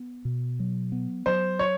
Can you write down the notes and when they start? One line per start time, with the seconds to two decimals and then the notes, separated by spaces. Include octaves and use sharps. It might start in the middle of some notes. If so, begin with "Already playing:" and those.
Already playing: B3
0.25 B2
0.60 F#3
0.92 B3
1.26 F#3 C5
1.59 C#5